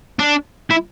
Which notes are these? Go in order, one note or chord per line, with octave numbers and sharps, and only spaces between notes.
D4
E4